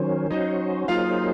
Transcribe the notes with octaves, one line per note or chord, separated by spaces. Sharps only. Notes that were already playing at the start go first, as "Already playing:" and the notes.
Already playing: D#3 F#3 C#4 C5
F#3 C#4 D#4 F#4 C5 D#5
F#3 A#3 D#4 F4 G#4 C5 F5